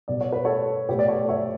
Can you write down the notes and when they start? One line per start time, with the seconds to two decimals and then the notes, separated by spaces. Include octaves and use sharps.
0.08 B2 G3 B3 D5
0.21 C#5
0.32 B4
0.45 A4 C#5
0.89 B2 A3 G4 B4
0.99 D5
1.08 A4 C#5
1.29 C#5 E5